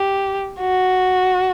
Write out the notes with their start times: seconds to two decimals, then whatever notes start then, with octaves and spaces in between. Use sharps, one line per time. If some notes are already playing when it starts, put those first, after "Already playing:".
Already playing: G4
0.60 F#4